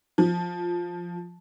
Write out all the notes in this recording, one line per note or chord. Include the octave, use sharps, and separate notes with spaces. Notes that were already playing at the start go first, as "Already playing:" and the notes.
F3